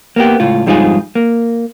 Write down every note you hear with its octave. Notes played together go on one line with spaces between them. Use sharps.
A#3 B3 G4
C#2 A2 F4
F2 G#2 G3 D#4 F4 G#4
A#3